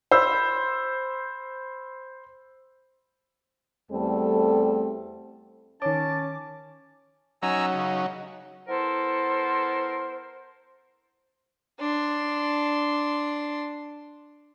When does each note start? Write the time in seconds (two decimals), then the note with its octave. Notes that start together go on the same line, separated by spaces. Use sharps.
0.11 C5 B5 E6
3.90 E2 G3 A3 C4 A4
5.82 D#3 C#4 C#5 A5 D6
7.42 F#3 C#4 D#4 G#5 A#5 E6
7.74 C#3
8.68 B3 E4 A4 A#4 C5
11.80 D4 C6